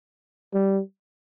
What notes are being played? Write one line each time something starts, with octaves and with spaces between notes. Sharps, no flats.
G3